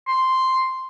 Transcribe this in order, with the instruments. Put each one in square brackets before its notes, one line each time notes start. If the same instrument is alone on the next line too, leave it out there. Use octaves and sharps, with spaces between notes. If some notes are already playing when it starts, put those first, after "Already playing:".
[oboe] C6